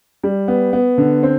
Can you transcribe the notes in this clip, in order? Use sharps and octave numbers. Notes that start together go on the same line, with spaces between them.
G3
B3
B3
D3
C4